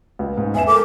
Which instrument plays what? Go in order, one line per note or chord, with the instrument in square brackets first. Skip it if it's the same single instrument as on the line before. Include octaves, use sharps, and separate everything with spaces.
[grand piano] C#2
G#2
[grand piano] E2 E5 E7 [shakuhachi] G#5
[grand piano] A4 A#4 [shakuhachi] D6